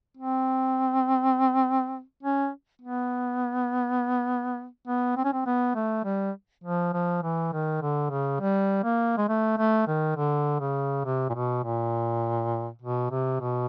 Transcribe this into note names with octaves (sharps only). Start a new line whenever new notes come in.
C4
C#4
B3
B3
C4
C#4
C4
B3
A3
G3
F3
F3
E3
D#3
D3
C#3
G3
A#3
G#3
A3
A3
D#3
D3
C#3
C3
A#2
B2
A#2
B2
C3
B2